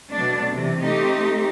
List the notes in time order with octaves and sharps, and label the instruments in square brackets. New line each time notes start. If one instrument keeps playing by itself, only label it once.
[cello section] B2 F#3 A3 D4
C3 E3
A3 C4 D#4 G4